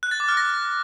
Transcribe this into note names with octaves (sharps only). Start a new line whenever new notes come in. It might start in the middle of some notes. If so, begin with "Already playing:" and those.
F#6
A6
D6
F6
A#6